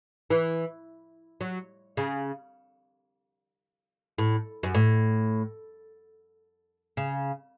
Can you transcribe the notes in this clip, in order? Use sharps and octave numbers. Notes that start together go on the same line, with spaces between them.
E3
F#3
C#3
A2
F#2
A2
C#3